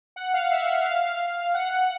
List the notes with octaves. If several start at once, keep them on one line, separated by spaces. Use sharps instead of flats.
F#5
F5
E5
F5
F#5